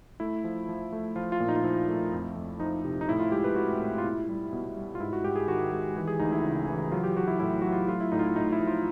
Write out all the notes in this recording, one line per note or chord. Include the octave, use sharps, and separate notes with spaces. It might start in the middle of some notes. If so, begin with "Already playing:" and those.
A3 E4
F3
F3
A3
F3 F4
F4
A#2
D#4
F4
F3 E4
A3
F2
F2
F3 D#4
C3
D#4
A2 E4
F4
G#3 G4
B4
A2 F#4
A2
F4
B2 E4
G3
B2
G3
F4
G#2 E4
F#4
G#2 G4
G#4
D#3 F#4
G#3 G4
E3 G4
G#4
D2 D#4
E4
C#3
E3
F#3 F4
G4
F#3 F#4
E4
A2 E4
F#3 F#4
F4
A3 F4
E4
A2 D#4
F4
E4
A2 D#4
E4
F3
F4